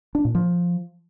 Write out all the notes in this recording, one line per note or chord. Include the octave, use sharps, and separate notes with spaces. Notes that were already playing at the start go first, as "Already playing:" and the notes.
D4
A#2
F3